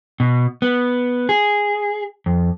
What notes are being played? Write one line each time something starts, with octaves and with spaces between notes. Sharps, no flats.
B2
B3
G#4
F2